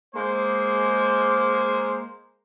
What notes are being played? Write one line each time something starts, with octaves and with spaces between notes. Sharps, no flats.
G#3 A#3 C5